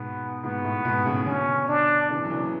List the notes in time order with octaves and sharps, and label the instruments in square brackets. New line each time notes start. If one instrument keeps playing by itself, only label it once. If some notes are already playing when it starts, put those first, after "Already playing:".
Already playing: [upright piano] G#2 B2 [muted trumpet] B3
[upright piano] G#2 B2 [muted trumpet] B3
[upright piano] A2
G#2 B2
A2 C#3
[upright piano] B2 D3 [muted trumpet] C#4
[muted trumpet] D4
[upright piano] C#3 E3 [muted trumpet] D4
[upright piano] F#3
C#3 E3